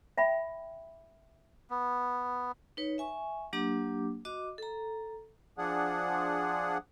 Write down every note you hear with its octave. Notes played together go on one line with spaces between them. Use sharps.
E5 G5 B5
B3
D#4 B4 C#5
E5 G#5 C#6
F#3 A#3 D4 G4 D6
F#4 D#5 D6
A4 A#5
F3 D4 G#4 F#5